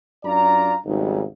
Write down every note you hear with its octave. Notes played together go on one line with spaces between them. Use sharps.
F#2 D4 F4 D5 A#5
G#1 C#2 G3 D#4